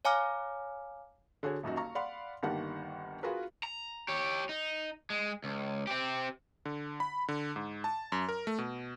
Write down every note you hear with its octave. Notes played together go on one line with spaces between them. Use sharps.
C#5 F5 G#5 A#5 D6 F6
D3 F#4 G#4 C#5
D#1 F#2 D#4 F#4
F5 A#5 C#6
D5 F5 F#5 B5 C6
G1 D#3 G3 A#3 F#5 A5
F4 F#4 G#4 A#4 B4
A#5
G4 C#5
D#4
G#3
C#2
C4 G4
D3
B5
D3
G#2
A5
F#2
A#4
A3
B2